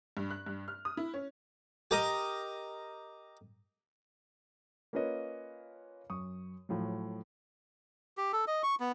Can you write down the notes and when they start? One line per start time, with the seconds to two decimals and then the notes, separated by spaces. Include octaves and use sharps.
0.17 G2
0.30 F#6
0.46 G2
0.68 F6
0.85 D#6
0.97 E4
1.14 C#4
1.91 G4 A#4 D#5
4.93 A#3 C#4 F4 B4 C#5 D#5
6.10 F#2 C#6 D#6
6.69 A2 F3 F#3
8.17 G4
8.33 A4
8.47 D#5
8.63 C#6
8.80 B3